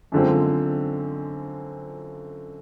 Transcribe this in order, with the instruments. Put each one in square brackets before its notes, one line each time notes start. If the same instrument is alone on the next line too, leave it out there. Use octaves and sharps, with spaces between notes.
[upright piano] F#2 D3 F3 G#3 C4